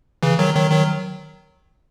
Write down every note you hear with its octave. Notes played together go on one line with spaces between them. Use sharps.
C#3 E3
D#3 F#3
D#3 F#3
D#3 F#3